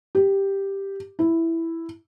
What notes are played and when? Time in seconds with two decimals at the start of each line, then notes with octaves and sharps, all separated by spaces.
0.15 G4
1.19 E4